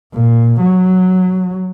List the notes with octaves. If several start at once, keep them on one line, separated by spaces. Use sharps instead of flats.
A#2
F#3